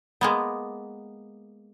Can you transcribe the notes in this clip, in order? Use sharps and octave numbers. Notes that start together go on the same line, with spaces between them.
G#3 A#3 B3